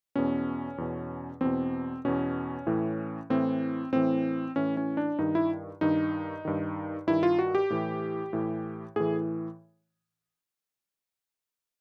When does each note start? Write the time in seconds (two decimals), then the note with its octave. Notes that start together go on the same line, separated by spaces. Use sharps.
0.15 E2 B2 C#4
0.78 E2 B2
1.41 E2 B2 C4
2.05 E2 B2 C#4
2.67 A2 E3
3.30 A2 E3 C4
3.92 A2 E3 C4
4.56 A2 E3 C#4
4.77 C#4
4.97 D4
5.19 G2 D#3 D#4
5.35 E4
5.81 G2 D#3 D#4
6.45 G2 D#3
7.07 G2 D#3 E4
7.23 F4
7.39 F#4
7.55 G4
7.70 A2 E3
8.33 A2 E3
8.96 A2 E3 G#4